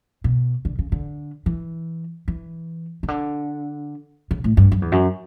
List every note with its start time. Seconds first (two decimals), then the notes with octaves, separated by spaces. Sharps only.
0.24 B2
0.65 D3
0.79 C#3
0.92 D3
1.46 E3
2.28 E3
3.03 C#3
3.08 D3
4.31 C#3
4.44 A2
4.57 G2
4.72 F#2
4.82 E2
4.92 F#2